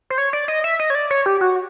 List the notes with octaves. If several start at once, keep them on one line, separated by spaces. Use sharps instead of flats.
C5
C#5
D5
D#5
E5
D#5
C#5
D5
C#5
G4
F#4